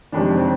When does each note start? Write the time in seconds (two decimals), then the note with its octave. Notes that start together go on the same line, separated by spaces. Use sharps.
0.12 F#1 F2 C3 D#3 G#3 D4
0.36 C4